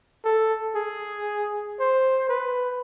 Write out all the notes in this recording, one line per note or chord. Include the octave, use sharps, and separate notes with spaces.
A4
G#4
C5
B4